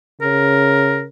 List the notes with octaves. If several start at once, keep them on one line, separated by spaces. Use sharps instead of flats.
C#3 A#4